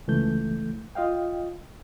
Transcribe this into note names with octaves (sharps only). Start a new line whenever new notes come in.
C#2 E3 A3 G6
F4 D#5 F5 G5